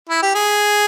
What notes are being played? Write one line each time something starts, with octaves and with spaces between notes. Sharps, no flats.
E4
G4
G#4